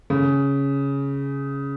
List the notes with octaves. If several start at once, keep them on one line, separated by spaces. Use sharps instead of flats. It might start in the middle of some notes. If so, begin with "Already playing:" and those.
C#3